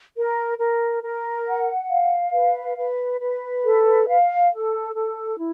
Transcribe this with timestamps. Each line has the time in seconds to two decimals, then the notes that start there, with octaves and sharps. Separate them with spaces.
0.16 A#4
0.59 A#4
1.03 A#4
1.47 F#5
1.90 F5
2.33 B4
2.77 B4
3.21 B4
3.64 A4
4.08 F5
4.51 A4
4.94 A4
5.38 E4